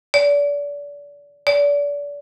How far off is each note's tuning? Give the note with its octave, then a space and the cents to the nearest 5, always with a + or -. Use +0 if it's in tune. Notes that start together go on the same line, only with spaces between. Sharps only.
D5 -30
D5 -30